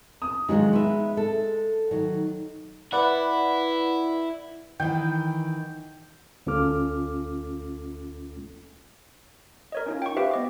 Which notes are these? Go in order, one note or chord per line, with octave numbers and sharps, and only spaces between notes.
D#6
D#3 F3 F#3 G#3 D#4
B3 E5
A4
D#3 F#3
E4 B4 D5 F#5
D#3 E3 G5
D2 C#4 F4 A4 D6 F6
A#4 C#5 D#5
C#4 D#4 F4
G5 C#6
G4 B4 C5 E5 F5 G5
B3 D#5 D6